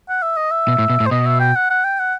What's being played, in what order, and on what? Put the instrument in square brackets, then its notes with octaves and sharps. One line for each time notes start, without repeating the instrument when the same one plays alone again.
[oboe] F#5
E5
D#5
E5
[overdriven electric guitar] B2
A2
B2
A2
[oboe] C5
[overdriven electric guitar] B2 [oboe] D#5
[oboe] E5
G5
F#5
F#5
G5
F#5